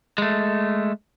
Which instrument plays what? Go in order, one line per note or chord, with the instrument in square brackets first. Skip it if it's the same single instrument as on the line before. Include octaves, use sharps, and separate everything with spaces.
[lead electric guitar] G#3 A3